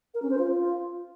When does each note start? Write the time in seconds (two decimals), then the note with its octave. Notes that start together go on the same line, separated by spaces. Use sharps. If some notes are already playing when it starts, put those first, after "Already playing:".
0.14 A#4
0.22 C#4
0.30 C5
0.38 F4